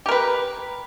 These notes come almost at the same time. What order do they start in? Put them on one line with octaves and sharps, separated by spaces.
G4 A#4 B4